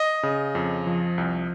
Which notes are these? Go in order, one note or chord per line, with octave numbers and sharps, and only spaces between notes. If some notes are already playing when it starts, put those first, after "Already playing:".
Already playing: D#5
C#3
F2
F3
C2